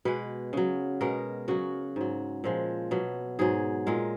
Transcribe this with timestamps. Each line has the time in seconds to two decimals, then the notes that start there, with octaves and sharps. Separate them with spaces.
0.05 B2 G#3 B4
0.53 C#3 F#3
1.01 B2 G#3 A#4
1.48 C#3 F#3 F#4
1.96 G#2 F#3
2.44 A#2 F3 G#3
2.91 B2 F#3
3.39 G#2 F#3 G#4
3.87 A#2 G#3 A#4